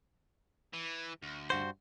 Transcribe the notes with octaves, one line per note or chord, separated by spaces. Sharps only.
E3
D2
G2 F#4 C5